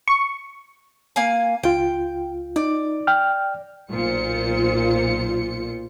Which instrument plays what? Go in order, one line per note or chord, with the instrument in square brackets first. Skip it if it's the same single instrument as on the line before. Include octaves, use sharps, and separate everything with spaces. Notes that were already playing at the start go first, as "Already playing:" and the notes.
[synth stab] C#6
[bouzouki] A#3 F5 G#5
[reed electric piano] C#2 F4 [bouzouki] G5
[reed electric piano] D#4 [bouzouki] D5
[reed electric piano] G5 F6
[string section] B1 A#2 F4 C5 C#7